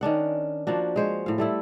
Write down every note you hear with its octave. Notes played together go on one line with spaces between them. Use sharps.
D#3 C#4 D4 F#5
F3 A#3 D4 F#4
G#3 C5 C#5
A2 F5
G3 A3 E4